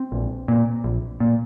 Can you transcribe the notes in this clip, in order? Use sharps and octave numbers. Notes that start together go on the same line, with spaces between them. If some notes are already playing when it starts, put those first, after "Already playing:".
Already playing: C4
A#1
A#2
A#1
A#2